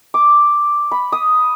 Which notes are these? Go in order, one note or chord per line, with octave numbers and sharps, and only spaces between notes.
D6
B5
D#6